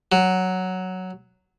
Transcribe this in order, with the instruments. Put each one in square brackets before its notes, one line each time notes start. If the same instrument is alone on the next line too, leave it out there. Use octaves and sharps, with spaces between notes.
[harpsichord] F#3